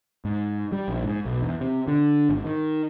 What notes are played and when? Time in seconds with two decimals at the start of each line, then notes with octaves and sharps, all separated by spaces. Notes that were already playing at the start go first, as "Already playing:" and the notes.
0.25 G#2
0.72 G3
0.88 A#1
1.04 G#2
1.25 B1
1.42 E2
1.61 C3
1.88 D3
2.29 G#1
2.45 D#3